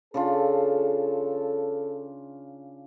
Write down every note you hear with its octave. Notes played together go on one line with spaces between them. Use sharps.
C#3 D4 F4 A4